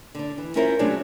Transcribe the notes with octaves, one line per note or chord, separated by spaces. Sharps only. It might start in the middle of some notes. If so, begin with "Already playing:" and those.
D3 D4
E3
C#4 E4 F4 A#4 C5 E5
C3 F#3 A3 C#4 D4 G#4